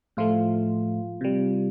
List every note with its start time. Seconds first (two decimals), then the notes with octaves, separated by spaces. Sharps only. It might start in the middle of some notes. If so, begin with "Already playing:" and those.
0.17 A2 F3 A3 F4
1.21 C3 G3